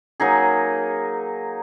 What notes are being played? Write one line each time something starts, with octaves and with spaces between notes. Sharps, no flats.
F#3 A#3 D#4 G#4